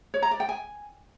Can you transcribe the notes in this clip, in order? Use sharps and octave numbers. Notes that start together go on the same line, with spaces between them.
C#5
A#5
D5
G5
G#5